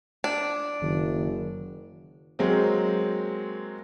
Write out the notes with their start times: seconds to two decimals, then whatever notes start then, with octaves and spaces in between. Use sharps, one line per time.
0.24 D4
0.82 F#1 D#3
2.39 F#3 G#3 A#3 C4